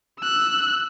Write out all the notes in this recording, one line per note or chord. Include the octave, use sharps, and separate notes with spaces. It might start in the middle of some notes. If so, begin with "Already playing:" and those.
E6 F#6